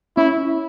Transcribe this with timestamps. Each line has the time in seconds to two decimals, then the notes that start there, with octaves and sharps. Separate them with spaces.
0.17 C#4 E4